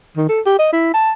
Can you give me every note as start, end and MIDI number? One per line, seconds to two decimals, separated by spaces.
0.17 0.27 51
0.29 0.41 69
0.46 0.55 67
0.59 0.69 75
0.73 0.90 64
0.94 1.12 81